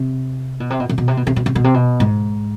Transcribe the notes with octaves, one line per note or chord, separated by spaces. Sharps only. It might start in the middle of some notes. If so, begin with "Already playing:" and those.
Already playing: C3
B2
C3
B2
C3
B2
C3
B2
C3
B2
C3
B2
C3
B2
G#2